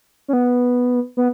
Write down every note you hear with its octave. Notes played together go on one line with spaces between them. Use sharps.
C#4
B3
B3